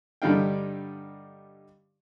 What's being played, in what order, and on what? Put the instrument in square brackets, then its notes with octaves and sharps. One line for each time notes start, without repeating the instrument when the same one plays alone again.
[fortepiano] G2 D3 G3 D#4 F5 G5